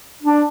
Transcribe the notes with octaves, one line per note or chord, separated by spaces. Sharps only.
D4